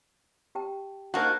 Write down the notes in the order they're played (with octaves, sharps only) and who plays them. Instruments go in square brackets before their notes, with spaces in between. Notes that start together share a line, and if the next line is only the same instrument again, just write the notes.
[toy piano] G4 G5 A5
[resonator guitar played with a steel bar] A#3 F#4 [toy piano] D4 C5 [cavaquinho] D#4 A#4 A5